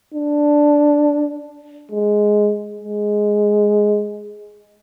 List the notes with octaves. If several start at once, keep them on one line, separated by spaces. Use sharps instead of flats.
D4
G#3
G#3